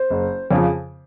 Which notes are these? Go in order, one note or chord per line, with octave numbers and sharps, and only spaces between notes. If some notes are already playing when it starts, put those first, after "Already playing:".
Already playing: C5
F#1
F2 C#3 F3